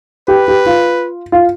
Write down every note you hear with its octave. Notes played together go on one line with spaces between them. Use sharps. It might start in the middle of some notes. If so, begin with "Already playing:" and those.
G4 B4
G4
F4
F4